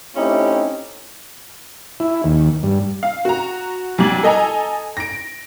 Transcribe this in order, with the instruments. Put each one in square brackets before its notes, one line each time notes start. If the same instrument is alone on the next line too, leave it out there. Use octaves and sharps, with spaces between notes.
[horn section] A3 C4 C#4 D#4 E4 G4
[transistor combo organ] E4
D#2
G2
[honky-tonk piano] F5
F#4 A#5
B1 G3 D6 G#6 F#7
A4 D#5 G#5 A#5
A#6 D7